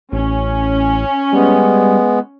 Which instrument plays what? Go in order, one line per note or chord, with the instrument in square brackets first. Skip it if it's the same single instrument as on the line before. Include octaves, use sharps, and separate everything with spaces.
[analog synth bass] A1 [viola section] C#4
[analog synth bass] G3 [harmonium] G#3 B3